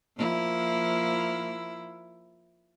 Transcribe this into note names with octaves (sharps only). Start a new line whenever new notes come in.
F3 A#3 E4